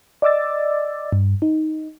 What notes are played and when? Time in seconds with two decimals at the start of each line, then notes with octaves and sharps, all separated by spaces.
0.22 D5 D#5 D6 E6 A6
1.12 G2
1.42 D#4